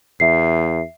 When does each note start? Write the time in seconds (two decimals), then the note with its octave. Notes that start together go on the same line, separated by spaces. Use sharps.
0.20 E2 E5 C7